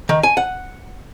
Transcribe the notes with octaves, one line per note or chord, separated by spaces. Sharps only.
D#3
G#5
F#5